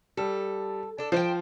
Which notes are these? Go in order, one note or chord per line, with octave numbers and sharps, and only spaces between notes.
G3 A4
D4 A4
F3 C5 D5 G5